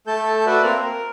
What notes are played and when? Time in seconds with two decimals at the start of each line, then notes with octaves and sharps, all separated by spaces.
0.07 A3 A4 A5 G6
0.47 F#4 A4 B4 D5 E5 F#5
0.63 A#3 C4 A#4 A#5
0.79 A#4